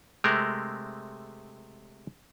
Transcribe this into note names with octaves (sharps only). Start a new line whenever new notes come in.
C3 G#3 A3 C4 A#4